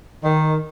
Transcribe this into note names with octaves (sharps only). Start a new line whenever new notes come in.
D#3